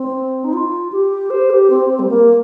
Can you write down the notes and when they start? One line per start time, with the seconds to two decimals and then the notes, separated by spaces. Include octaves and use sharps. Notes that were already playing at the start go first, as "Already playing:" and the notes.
Already playing: C4
0.44 D#4
0.53 F4
0.92 G4
1.30 C5
1.50 G4
1.70 C4
1.89 C4
1.99 G3
2.09 A#3